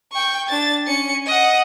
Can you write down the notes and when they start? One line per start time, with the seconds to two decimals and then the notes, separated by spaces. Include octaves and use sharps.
0.12 G5 C#6
0.49 D4 A6
0.87 C#4 C#7
1.26 D#5 F#5